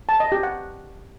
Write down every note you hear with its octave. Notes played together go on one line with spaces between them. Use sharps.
A5
D#5
G4
F#5